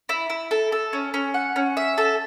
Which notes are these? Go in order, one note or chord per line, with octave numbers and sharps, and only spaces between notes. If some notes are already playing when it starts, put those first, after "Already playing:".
E4
E4
A4
A4
C#4
C#4
F#5
C#4
E5
A4